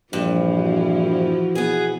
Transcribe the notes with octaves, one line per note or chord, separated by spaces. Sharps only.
A#1 G2 E3 F3 E4
F#4
B2 B3 G#4